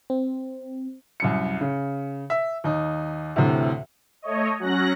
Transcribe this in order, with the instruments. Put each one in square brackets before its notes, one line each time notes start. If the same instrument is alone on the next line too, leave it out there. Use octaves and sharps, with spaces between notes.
[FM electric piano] C4
[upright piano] C2 F#2 C#7
C#3
E5
D#2 D#4
D2 A2 C3 E3
[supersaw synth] A3 C#5 D#5
F#3 C#4 F#6 A#6